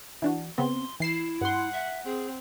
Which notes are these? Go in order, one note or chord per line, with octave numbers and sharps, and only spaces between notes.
E3 D4 F#4
C#3 B3 C4 C6
E3 E4 C7 E7
G2 F#5 C6
E5
C4 G#4